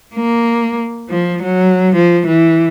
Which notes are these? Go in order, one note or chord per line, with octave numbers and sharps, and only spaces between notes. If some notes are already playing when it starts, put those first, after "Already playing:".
A#3
F3
F#3
F3
E3